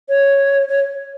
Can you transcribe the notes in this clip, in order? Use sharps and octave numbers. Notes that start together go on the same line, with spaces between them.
C#5
C#5